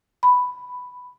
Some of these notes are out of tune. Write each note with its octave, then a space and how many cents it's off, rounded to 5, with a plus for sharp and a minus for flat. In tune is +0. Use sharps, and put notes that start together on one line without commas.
B5 +5